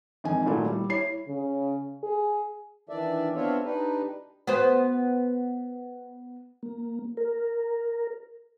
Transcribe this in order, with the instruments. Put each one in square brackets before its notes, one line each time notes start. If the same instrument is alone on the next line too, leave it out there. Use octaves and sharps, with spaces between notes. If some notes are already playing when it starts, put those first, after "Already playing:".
[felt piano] G#1 F2 G#5
A#2 D#3 F#3 A3 E4 F#4
G3
E4 C#5 C7
[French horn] C#3
G#4
[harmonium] D#3 E3 D4 D5 E5
B3 C4 D4 F4 C#5 E5
D4 D#4 G4 B4
[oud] B3 F#4 C5
[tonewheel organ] A#3
A#4